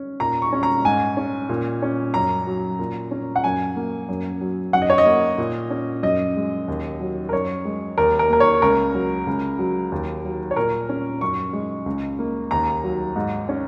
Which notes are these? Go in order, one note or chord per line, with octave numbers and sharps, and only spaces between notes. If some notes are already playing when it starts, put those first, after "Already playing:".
Already playing: C#4
A#2 A#5
C#6
C#4
A#5
G#2 G#5
C#4
A#2
C#4
F#2 A#5
F#3
A#2
C#4
F#5
F#2 G#5
A#3
F#2
F#3
F#2 F#5
D#5
C#5
D#5
A#3
A#2
C#4
F#2 D#5
G#3
D#2
F#3
A#4
F#2 C#5
G#3
D#2 A#4
A#4
A#3 A#4
C#5
C#2 A#4
F#3
C#2
F#3
D#2
F#3
C#5
A#2 A#4
C#4
F#2 C#6
G#3
C#2
A#3
D#2 A#5
F#3
G#2
C#4